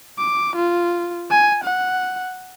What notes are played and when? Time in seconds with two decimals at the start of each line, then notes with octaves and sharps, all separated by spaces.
0.18 D6
0.56 F4
1.31 G#5
1.64 F#5